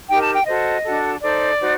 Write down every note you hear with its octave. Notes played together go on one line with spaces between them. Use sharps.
D#4 G4 A#4 G5
A5
G5
F#4 A4 C5 D#5
D4 F#4 A4
D#4 A4 C5 D5
D#4 F#4 C5